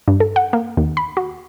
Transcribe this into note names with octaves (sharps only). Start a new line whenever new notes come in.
G2
A4
F#5
A#3
D#2
B5
F#4